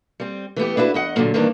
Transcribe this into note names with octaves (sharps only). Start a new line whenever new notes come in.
G3 C4
E3 A3 B3 G4
D4 E4 F#4 B4
E2 D#5 F#5
A#2 D3 F3 F#3 A#3
G2 D#3 E3 A#3 D4 A#4